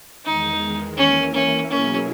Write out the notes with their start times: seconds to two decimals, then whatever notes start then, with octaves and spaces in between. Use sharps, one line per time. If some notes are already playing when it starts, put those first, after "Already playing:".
0.25 E2 D#3 G#3 D#4
0.97 E3 A#3 C#4 E4 A#4
1.34 C#4
1.69 B2 F#3 A#3 C#4 E4 G#4